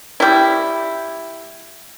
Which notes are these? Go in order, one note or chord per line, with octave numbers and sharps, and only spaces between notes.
G3 E4